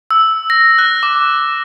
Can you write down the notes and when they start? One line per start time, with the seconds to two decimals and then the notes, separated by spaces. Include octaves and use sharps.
0.11 E6
0.50 A#6
0.78 F#6
1.03 D6